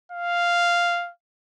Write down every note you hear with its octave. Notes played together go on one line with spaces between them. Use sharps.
F5